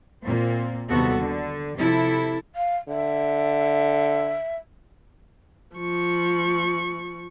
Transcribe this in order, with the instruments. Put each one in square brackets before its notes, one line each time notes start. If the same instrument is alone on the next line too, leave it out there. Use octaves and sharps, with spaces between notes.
[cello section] A#2 A#3 C4
D#2 C3 G3 B3 F#4 A4
D3
C3 F3 E4 A4
[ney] F5
[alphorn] D3 [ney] E5
[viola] F3 C#6